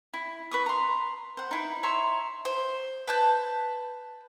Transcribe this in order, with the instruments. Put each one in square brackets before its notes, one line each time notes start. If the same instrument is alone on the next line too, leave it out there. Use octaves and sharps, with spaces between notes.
[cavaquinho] E4
B4 C#6 D#6
A#5 C6
C5 F#5
D#4 E4 B4
C#5 E5 A#5 C6
[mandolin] C5
B4 A5 G6